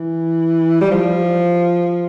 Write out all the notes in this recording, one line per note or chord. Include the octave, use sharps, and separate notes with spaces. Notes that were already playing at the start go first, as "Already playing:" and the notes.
Already playing: E3
G3
F3